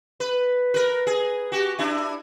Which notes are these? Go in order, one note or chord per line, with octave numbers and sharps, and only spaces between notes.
B4
A#4 B4
G#4
F#4 G4
D4 E4